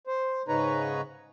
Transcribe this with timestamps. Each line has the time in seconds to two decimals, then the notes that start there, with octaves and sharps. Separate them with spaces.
0.07 C5
0.48 G#2 C#3 D#4 B4 C#5 A#5